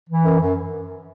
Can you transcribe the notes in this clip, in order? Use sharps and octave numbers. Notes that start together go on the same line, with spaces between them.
E3
F#2
F#2